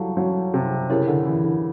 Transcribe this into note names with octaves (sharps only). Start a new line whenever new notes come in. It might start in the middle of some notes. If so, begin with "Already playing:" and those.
Already playing: F#3 G3 E4 A4 C#5 F5 A5
F#3
C3
C#3 E4 G4 A#4 C#5
D3
E3
D3